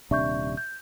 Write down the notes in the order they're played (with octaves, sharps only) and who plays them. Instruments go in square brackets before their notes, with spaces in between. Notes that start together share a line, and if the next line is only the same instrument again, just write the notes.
[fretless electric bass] D#1 C3 D4 [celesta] E5 C#6 G6
[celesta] G6